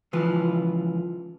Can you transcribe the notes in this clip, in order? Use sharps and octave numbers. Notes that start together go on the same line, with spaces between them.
C#2 E3 F3 B4